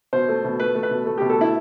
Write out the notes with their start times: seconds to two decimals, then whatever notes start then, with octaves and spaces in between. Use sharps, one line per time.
0.13 B2 C5
0.29 A3
0.44 B2
0.59 A3 B4
0.75 A3
0.83 B4
0.91 B2
1.06 A3
1.18 B2 G4
1.30 A4
1.38 A3 E4